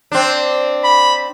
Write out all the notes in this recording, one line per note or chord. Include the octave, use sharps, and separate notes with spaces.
C4 D4
B5